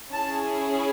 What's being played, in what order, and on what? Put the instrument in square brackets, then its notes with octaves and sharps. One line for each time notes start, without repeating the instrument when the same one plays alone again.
[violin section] C#4 E4 G#4 A5